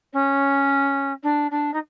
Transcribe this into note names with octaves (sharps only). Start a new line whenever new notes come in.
C#4
D4
D4
D#4